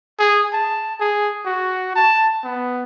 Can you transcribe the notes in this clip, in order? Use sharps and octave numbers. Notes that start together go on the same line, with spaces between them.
G#4
A5
G#4
F#4
A5
B3